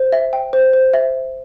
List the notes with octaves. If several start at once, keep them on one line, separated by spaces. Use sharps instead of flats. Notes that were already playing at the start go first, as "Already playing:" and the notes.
Already playing: C5
E5
G5
C5
C5
E5